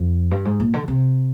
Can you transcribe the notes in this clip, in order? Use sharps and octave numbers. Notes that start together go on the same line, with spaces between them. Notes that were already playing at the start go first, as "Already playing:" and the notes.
Already playing: F2
G2
G#2
A#2
D3
C3